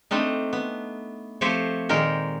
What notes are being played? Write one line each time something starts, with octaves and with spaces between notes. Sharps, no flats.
A3 C4 D4 D#4
B3
F3 A3 C4 G4 C5 C#5
A#2 D#3 G#3 A#4 G5